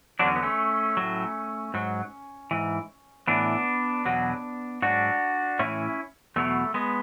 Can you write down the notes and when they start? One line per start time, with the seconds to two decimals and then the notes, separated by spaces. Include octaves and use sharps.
0.19 E2 D3 F#3 D4
0.27 C#4
0.36 B3
0.43 A3 C#4
0.97 A2 F#3
1.74 G#2 F#3
2.51 G#2 E3
3.27 A2 E3 B3 D4
4.05 E2 B2 F#3
4.82 G#2 F#3 D4 F#4
5.59 A2 E3 C#4 E4
6.36 E2 B2 F#3 A3
6.74 G#3 B3